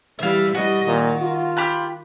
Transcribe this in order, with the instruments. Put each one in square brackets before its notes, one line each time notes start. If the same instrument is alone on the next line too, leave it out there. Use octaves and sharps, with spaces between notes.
[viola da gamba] E3 G3 [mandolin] E5 F5
[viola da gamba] G3 D#5 [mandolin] F#4
[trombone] A#2 [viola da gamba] D#3
[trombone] F4
[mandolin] G4 B5 F#6